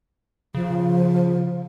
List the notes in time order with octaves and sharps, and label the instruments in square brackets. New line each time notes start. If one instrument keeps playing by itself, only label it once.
[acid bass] C#3 [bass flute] F3